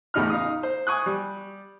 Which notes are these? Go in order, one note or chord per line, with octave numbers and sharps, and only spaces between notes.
E2 A2 C#3 D#4 B5 F6
D#4 F5 D#6
C5
G#5 C#6 D#6 F#6
G3